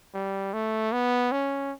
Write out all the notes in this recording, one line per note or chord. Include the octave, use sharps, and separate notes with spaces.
G3
A3
B3
C#4